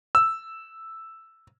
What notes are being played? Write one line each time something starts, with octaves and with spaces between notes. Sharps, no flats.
E6